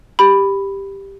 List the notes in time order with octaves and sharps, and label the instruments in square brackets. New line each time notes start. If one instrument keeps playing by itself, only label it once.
[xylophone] G4 B5